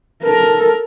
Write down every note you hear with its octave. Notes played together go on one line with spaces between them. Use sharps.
A4 A#4